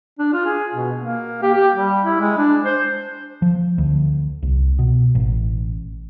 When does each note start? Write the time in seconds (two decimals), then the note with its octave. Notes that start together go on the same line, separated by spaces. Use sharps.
0.19 D4
0.33 F4
0.46 G#4
0.74 B2
0.99 A#3
1.43 G4
1.54 G4
1.74 G3
2.05 E4
2.20 G#3
2.38 D4
2.65 C5
3.42 F3
3.78 D2
4.43 C2
4.79 B2
5.15 A1